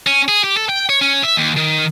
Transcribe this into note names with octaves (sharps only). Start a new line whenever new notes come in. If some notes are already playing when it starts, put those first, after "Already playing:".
C#4
G#4
G4
A4
G5
C#5
C#4
E5
D#2
D#3